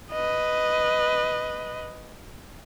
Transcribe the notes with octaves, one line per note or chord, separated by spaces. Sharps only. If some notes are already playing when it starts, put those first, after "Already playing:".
B4 D#5